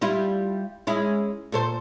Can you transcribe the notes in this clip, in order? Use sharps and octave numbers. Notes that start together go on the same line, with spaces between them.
G3 E4 F4
G#3 C#4 E4
A#2 A4 C5